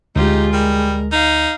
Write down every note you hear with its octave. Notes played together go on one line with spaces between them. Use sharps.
D2 G#3 D#4 F4 G4
G3 A#4
D#4 F5